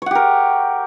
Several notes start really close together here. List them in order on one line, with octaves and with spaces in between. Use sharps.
C#5 F#5 G4 A#4